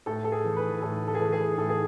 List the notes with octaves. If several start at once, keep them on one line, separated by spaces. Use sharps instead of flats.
A2 A4
A4
G#4
E3
B4
A2 A4
A4
G#4
E3 A4
G#4
A2 A4
G#4